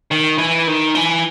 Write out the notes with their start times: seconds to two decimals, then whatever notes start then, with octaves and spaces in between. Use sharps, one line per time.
0.11 D#3
0.38 E3
0.67 D#3
0.95 E3